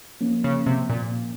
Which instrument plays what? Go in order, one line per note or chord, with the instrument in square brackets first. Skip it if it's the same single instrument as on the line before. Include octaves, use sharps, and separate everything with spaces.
[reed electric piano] F3 A#3 C#4
[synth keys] C#3
C3
A#2